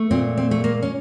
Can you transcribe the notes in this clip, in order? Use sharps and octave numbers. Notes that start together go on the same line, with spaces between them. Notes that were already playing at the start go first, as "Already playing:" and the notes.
Already playing: A3
A#2 C4
C4
A3
A#3
C#4